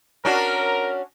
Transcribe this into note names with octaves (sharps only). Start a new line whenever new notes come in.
C#4 D4 F#4 A#4